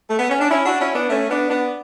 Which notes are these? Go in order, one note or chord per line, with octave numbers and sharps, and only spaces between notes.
A3
B3
C#4
D4
C#4 E4
D4 F#4
C#4 E4
B3 D4
A3 C#4
B3 D4
B3 D4